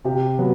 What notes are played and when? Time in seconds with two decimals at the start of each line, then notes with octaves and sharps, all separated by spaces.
0.05 C3 G4
0.39 F#3 B3